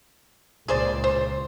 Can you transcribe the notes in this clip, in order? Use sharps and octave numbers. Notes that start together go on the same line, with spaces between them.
C#2 A#2 G#4 C5 D5
C5